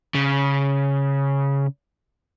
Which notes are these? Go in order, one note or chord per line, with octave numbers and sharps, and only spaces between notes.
C#3